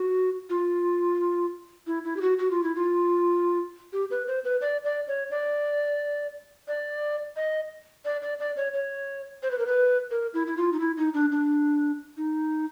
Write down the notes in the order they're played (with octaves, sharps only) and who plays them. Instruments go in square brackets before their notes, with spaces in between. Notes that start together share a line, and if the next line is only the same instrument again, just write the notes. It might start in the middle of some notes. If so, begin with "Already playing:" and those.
Already playing: [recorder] F#4
F4
E4
E4
G4
F#4
F#4
F4
E4
F4
G4
B4
C5
B4
D5
D5
C#5
D5
D5
D#5
D5
D5
D5
C#5
C#5
C5
B4
A#4
B4
A#4
E4
E4
F4
D#4
E4
D#4
D4
D4
D#4